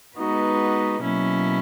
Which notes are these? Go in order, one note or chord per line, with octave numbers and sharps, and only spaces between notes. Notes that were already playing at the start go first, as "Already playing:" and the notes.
G#3 B3 D#4 F#4 B4
B2 F#3 A#3 C#4 E4